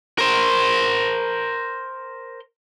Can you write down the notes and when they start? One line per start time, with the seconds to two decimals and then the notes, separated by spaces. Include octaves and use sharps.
0.18 A#4 C5